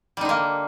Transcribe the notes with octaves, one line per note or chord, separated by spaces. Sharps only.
D3 G3 A#3 D#4